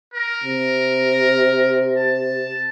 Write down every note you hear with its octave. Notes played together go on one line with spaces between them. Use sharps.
A#4
C3
A5